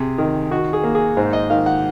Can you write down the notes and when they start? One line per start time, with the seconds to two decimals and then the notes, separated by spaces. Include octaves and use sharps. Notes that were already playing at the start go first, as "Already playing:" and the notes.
Already playing: C3 G#4
0.18 D#3
0.51 D#3 F#4
0.73 G#4
0.84 A#3
0.95 G#4
1.17 G#2 C5
1.33 D#5
1.50 D#3 F5
1.66 F#5